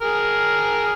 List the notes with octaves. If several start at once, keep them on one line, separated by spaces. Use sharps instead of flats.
G#4 A#4